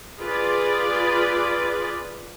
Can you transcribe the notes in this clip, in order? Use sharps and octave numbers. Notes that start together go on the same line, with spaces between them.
F4 G#4 B4 D5